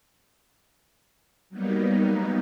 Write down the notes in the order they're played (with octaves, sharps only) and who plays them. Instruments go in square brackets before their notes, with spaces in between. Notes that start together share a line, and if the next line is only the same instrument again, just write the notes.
[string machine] F#3 G3 A#3 B3 D#4